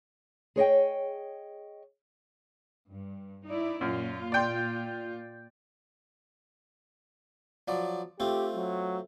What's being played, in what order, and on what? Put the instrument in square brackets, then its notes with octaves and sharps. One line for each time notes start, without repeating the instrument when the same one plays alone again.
[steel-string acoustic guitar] G#4 C#5 D#5 G5
[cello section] G2
D#4 E4 D5
[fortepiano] F#2 [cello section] A#2 F4
[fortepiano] D5 G5 C6
[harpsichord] F3 F#3 D5
[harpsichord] A3 C4 F4 [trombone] G4
[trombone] F#3